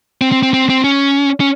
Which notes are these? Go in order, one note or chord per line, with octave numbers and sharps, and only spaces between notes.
C4
C4
C4
C4
C4
C#4
C#4